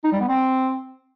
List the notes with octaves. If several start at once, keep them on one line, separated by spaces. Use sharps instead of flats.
D#4
G3
B3
C4